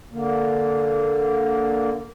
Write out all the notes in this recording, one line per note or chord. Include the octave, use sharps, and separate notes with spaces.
D3 A#3